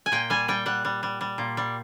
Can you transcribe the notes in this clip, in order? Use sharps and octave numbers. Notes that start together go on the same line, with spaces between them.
G#5
A#2 G5
G3 G#5
G3 G5
G3 F#5
G3
G3
G3
A#2
G3